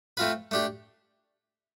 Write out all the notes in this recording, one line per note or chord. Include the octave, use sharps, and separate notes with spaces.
A3 C4 F4 B4
A3 D4 G4